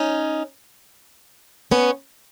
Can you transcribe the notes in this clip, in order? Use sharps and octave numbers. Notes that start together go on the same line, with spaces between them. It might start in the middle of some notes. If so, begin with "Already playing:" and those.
Already playing: C#4 D#4
B3 C#4